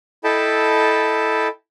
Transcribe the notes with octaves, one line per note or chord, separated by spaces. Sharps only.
E4 A4 D#5 G5 A5 B5